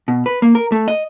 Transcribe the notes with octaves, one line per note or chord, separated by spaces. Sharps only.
B2
B4
A#3
A#4
A3
D#5